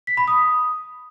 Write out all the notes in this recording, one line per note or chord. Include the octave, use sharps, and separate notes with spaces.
B6
B5
D#6